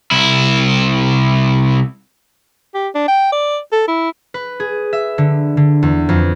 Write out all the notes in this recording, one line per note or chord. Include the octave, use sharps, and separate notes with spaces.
C2 E4
G4
D4
G5
D5
A4
E4
B4
G#4
E5
D3
D3
E2
F2